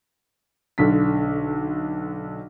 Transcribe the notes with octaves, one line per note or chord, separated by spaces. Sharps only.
B1 D3 B6